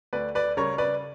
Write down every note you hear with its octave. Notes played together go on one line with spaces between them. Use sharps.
D2 B4 D5
B4 D5
C#3 G3 A#4 C#5
B4 D5